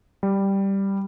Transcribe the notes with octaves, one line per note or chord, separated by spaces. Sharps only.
G3